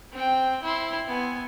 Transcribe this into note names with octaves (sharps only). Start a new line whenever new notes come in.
C4 G5
E4 C6
B3 G#5